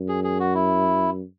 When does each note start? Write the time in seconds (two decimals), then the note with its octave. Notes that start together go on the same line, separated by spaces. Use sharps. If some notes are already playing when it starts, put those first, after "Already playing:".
Already playing: F#2
0.08 G#4
0.24 G#4
0.40 F#4
0.54 E4